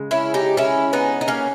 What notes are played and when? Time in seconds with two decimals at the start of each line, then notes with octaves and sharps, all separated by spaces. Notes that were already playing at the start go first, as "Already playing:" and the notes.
Already playing: C#3 G#3
0.11 C#4 E4
0.34 D#4 G4
0.57 C#4 E4
0.93 B3 D#4
1.21 D#4
1.28 A#3 C#4